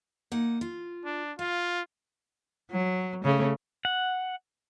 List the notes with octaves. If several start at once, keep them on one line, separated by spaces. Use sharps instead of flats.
A#3 D#4 F#5
F4
D4
F4 F5
F#3
C#3 A3
F#5